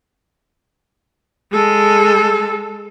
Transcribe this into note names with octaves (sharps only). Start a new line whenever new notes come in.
G#3 A4